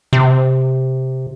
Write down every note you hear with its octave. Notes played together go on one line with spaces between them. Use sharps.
C3